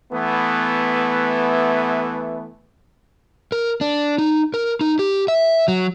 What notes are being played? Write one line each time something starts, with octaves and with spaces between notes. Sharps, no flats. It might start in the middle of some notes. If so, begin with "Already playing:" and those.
E3 A3 B3
A#4
D4
D#4
A#4
D#4
G4
E5
F#3